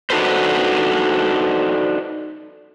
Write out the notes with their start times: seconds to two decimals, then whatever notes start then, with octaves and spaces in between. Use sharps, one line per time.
0.10 D4 D#4 F#4 A4 B4 C5